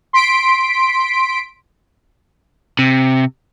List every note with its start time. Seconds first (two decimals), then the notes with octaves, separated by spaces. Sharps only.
0.13 C6 B6 D7
2.79 C3